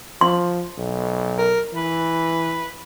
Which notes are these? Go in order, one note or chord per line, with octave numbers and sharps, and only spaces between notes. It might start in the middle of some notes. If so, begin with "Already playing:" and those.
F3 C6
B1
A#4
E3 B4